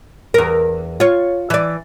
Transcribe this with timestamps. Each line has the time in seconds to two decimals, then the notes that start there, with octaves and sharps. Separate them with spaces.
0.34 E2 A#4
1.00 F4 C#5
1.50 E3 D5